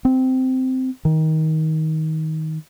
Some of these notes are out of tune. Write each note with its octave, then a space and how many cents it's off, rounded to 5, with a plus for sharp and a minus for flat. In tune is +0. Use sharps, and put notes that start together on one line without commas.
C4 -15
D#3 +20